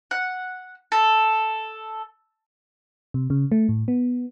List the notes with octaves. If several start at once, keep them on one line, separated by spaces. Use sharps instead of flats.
F#5
A4
C3
C#3
A3
A2
B3